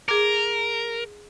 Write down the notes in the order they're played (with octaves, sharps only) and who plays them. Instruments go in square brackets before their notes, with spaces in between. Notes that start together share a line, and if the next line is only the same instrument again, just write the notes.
[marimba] G#4 D6 [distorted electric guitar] A#4